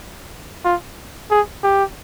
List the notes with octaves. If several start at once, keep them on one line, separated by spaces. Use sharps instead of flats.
F4
G#4
G4